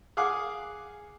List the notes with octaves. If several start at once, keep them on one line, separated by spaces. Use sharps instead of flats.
G#4 F5 F#5 G#5 D6